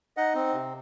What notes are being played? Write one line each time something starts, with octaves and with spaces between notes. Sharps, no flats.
D#4 D#5 F#5
C4
C3